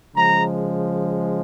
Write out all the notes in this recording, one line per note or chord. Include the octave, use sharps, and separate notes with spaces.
C#3 F3 G#3 A#5